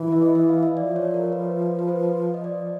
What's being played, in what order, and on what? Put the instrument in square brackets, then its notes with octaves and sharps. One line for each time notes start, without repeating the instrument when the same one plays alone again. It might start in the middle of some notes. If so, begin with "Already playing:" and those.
Already playing: [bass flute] E3
[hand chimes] E5
D#5
E5
F5
E5
[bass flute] F3 [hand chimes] D5
[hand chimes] C#5
A#4
B4
B4
C5
D#5
D5